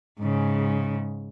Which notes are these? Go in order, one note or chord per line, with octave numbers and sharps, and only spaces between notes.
G#2 C#3